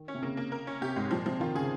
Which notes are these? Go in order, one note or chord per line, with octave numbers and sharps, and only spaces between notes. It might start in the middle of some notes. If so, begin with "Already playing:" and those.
Already playing: D#3
C#4
C3
C#3 A#3
A#3
A#4
C#4
C3 G4
G#2 G#3
A#2 F3
C3 F3
D#3 F4
C#3 G#4